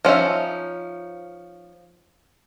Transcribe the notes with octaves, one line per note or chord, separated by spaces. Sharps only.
F3 C#4 D#4 E5